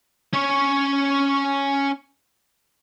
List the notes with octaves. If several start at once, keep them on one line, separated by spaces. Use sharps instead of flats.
C#4 C#5